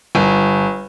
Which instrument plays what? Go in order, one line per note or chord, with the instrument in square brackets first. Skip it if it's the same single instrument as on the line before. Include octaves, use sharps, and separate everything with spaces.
[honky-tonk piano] G1